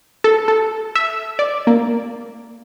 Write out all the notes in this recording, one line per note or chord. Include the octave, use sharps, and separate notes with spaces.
A4
A4
E5
D5
A#3